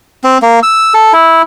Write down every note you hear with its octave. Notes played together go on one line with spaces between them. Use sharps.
C4
A#3
E6
A4
E4